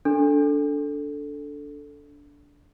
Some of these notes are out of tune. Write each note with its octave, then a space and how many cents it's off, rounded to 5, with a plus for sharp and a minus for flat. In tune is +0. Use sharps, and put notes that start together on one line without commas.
D4 -15 A4 +0